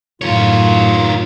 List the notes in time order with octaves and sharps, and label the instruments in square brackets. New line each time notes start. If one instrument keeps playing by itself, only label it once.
[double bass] F#2 A2 [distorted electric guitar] D#3 C#5 [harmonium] F4